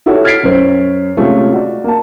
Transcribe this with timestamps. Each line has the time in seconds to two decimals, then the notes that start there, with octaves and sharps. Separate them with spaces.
0.06 E4 F#4 G4 A4 C#5
0.24 F6 G#6 A6 B6 C7 D7
0.43 F#2 C#4 C5
1.17 C3 G#3 A3 C#4 F4 A4
1.53 F#4 D5
1.84 A#3 A5